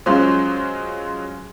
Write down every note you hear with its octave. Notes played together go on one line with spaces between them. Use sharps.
F#3 G#3 C#4 F4 C5